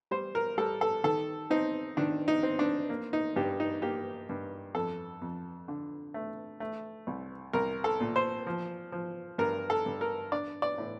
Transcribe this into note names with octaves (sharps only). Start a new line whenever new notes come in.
G3 C5
A#4
G3 A4
A4
D#3 A4
C4 D#4
D#3 D4
D#4
C4
D4
A#3
D#4
G2 G4
D#4
A#3 G4
G2
F2 A4
F2
D3
A3
A3
C2
C2 A#4
A4
A#2
C5
F3
F3
G2 A#4
A4
G2
A#4
D4 D5
D5
A2